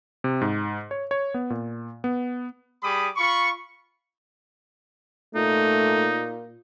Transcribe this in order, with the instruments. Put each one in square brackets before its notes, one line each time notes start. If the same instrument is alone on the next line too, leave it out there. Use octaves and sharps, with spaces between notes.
[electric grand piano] C3
G#2
C#5
C#5
B3
A#2
B3
[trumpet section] G3 G#4 B5 D6 D#6
F4 B5 C#6
[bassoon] A#2 [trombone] A3 [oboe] D#4